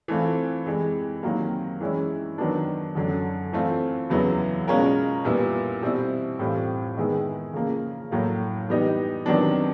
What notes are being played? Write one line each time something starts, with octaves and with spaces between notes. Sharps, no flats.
E3 A3 C4 F4
C3 E3 G#3
C3 D#3 F#3 A#3
E3 G#3 C#4 E4
D#3 F#3 B3 D4
F#2 D3 F#3
E3 A3 C4 F4
E2 C#3 F#3 B3 E4
B2 G#3 C#4 F4 A#4
A#2 G3 B3 E4
B2 G3 C4 E4
A2 E3 G3 C4 F4
D#3 G#3 B3 E4 G#4
C#3 F3 A#3
A2 F#3 A#3
E3 G3 B3 D#4 G4
C3 D#3 F#3 B3 D4